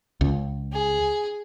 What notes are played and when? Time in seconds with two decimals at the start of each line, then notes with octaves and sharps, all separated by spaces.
0.21 C#2
0.72 G#4